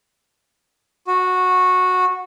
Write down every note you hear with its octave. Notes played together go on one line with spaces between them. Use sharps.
F#4